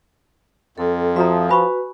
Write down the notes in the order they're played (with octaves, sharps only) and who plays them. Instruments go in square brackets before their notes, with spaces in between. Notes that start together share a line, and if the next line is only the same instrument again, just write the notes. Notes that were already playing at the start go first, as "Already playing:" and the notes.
[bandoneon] F2 [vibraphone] A4
[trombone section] F3 [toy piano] F#4 A#5 [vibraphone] E5 D#6
[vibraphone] F#4 B4 [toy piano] G#5 B5 C#6